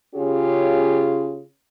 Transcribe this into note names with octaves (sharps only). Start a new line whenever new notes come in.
C#3 C#4 F4 G4 G#4